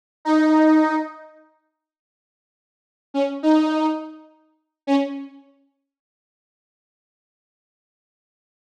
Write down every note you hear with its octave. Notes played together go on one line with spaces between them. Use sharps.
D#4
C#4
D#4
C#4